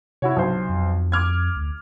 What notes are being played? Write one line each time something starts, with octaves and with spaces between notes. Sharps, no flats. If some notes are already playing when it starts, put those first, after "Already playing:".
C3 E4 F#4 C#5
B1 C5
F2
D6 F6 G#6
D2